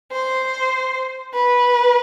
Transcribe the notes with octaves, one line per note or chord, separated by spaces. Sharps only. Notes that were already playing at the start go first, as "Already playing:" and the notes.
C5
B4